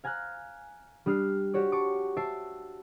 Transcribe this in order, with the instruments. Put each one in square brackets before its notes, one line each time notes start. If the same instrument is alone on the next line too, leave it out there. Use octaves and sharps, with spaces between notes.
[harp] F5 G#5 A#5 F6 F#6
G3 D4 D#6 F6 C7
F#4 G4 C#5 D5
A5 C#6 D6
E5 A5 C7 D7